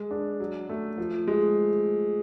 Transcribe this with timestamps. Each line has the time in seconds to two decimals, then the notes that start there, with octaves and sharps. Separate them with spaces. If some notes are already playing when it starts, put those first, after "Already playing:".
Already playing: G#3
0.11 D4
0.40 F#3
0.69 A3
0.98 F3
1.27 G#3